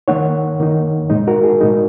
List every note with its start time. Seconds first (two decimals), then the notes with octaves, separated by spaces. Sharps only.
0.08 D#3 A#3 D#4 C#5 F#5
0.60 D#3 A#3 D#4
1.10 A#2 G#3 D#4
1.27 F#4 A#4
1.44 G#4
1.61 A#2 G#3 D#4